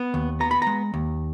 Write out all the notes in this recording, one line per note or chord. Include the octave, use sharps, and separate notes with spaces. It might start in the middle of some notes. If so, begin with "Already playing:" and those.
Already playing: B3
D#2
B3 A#5
B5
G#3 A#5
D#2